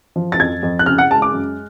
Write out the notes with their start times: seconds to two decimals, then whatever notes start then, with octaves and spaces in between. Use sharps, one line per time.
0.16 F3
0.32 A6
0.39 F2 G#6
0.63 F2
0.79 F#6
0.86 C#3 F6
0.98 F#5
1.11 G#3 A5
1.22 D6
1.34 F#2